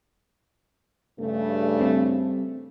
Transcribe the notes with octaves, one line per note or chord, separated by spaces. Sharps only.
G2 C#3 A3
G3 C4